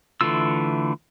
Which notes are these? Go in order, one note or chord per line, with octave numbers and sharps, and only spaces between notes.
D3 E3 A3 F4 E6